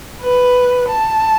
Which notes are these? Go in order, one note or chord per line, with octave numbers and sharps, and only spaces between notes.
B4
A5